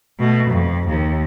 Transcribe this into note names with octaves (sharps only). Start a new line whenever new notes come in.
B2 A3
F2
D#2